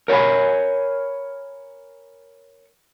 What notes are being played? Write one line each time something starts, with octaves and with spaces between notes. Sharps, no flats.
A#4 C#5 E5 G#5 B5